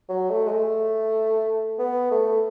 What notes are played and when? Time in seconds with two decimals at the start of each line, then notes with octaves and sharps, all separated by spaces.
0.09 F#3
0.30 A3
0.47 G#3
0.51 A3
1.79 B3
2.11 A3